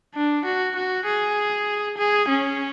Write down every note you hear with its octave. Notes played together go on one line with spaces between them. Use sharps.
D4
F#4
F#4
G#4
G#4
C#4